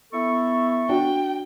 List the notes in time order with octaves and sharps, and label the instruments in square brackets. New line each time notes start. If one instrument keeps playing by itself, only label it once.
[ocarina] B3 [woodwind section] E4 A4 C#6
[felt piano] D4 F#4 [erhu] G5